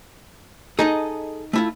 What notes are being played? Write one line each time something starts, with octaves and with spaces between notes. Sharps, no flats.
D#4 G#4 A4 D#5
A3 E4 F4